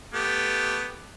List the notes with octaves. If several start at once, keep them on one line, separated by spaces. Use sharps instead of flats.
A3 B3 G4